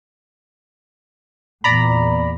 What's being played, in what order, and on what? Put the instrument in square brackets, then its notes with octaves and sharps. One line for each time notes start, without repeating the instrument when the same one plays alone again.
[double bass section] E2 A#2 [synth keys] D5 A#5 B5